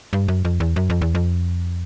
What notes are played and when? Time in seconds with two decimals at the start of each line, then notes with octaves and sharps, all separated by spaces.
0.13 G2
0.28 F#2
0.45 F2
0.60 E2
0.76 F#2
0.90 F2
1.02 E2
1.15 F2